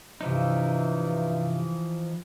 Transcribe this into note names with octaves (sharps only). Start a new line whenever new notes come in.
G2 C3 E3 F3 D#4